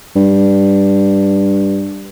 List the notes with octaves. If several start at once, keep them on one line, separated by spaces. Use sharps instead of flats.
G2